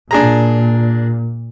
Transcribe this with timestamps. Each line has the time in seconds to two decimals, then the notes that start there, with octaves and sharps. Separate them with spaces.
0.11 A#2 D4 G#4 A#5